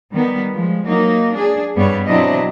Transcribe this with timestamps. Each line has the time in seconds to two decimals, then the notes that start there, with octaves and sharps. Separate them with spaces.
0.12 D#3 G3 B3
0.55 F3 G#3
0.84 F#3 A#3 D#4
1.33 D4 G#4
1.75 G2 G3 B3 C#5
2.07 B2 F#3 C4 D4 E4 D#5